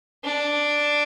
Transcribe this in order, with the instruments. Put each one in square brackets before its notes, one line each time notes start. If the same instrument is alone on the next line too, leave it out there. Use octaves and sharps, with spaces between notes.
[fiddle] D4